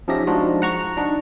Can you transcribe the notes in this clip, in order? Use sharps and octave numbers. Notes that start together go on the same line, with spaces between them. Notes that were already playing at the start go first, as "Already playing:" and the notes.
F3 C#4 D#4 G4 E5 A#6
F3 G#3 D4 D#4 F4 F#4
F#5 A#5 C#6
D4 D#4